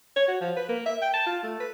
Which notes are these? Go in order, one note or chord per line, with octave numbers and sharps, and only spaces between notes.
C#5
F#4
F3
B4
A#3
E5
G5
A5
F4
A3
B4